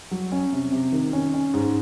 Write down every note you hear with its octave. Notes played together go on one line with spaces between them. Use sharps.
F#3
C#4
C3
C3
D#3
C#4
C#4
G#2